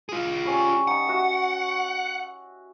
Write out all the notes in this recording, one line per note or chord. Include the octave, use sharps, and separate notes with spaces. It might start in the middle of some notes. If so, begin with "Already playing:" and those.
F4 G#4
G3 C#4
D#4 F#5
F#4 E5